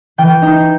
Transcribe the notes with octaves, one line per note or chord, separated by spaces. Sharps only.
E3 G5
D#4